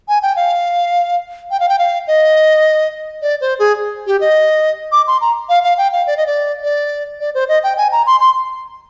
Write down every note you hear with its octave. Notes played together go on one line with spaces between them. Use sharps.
G#5
G5
F5
G5
F5
G5
F5
D#5
D5
C5
G#4
G4
D#5
D6
C6
A#5
F5
F5
G5
F5
D5
D#5
D5
D5
D5
C5
D#5
G5
G#5
A#5
C6
C6